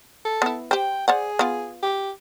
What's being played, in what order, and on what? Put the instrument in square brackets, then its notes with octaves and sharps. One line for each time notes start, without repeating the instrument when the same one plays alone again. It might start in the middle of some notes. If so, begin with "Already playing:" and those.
[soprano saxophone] A4
[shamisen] B3 E4
[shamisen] G4 C5 [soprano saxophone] G5
[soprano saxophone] G#4 [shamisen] C5 D5 F#5
[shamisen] B3 F4
[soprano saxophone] G4